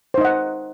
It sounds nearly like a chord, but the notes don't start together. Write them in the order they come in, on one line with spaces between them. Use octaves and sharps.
C5 D#4 D#5 F#5